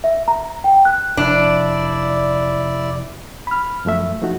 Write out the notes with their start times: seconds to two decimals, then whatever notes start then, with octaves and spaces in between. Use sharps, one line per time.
0.04 E5
0.28 A#5
0.64 G5
0.85 F#6
1.17 F1 D4 E4 D5
3.47 B5 F6
3.85 F#2 F3 A3 E5
4.22 F3 A3 D#4 F#4